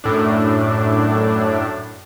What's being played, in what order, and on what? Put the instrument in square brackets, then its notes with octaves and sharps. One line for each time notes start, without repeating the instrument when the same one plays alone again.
[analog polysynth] F#2 A2 D4